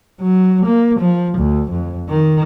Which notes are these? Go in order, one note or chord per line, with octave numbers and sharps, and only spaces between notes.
F#3
A#3
F3
D2
F2
D#3